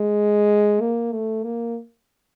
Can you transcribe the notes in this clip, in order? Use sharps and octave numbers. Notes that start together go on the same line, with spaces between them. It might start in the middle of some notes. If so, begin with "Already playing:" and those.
Already playing: G#3
A#3
A3
A#3